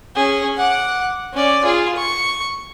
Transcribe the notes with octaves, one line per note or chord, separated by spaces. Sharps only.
C#4 G#4
F#5 D6
C#4 D5
F4 G#4
C#6